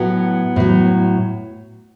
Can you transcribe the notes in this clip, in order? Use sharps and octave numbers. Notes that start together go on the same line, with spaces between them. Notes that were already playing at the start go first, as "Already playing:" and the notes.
Already playing: A2 F#3 B3
A2 F#3